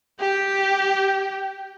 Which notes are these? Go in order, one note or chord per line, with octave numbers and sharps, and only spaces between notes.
G4 G5